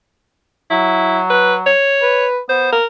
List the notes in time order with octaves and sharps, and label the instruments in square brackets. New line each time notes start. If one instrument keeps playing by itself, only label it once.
[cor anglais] F#3 [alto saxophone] E4
[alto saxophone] B4
C#5
[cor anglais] B4
[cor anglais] B3 [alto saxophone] C5
[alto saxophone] A#4